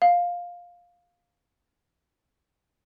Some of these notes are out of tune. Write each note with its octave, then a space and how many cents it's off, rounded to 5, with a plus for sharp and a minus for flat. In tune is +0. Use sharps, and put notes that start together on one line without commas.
F5 +10